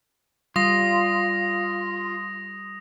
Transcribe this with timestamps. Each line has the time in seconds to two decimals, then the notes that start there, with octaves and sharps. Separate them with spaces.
0.56 G3 F4 D#6 A#6